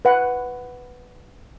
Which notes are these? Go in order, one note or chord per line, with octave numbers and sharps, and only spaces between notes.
B4 F#5